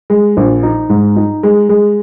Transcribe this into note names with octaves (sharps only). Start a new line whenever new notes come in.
G#3
A#1
D#4
G#2
D#4
G#3
G#3